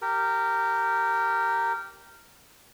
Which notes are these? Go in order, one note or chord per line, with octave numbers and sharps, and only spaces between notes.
G4 A#4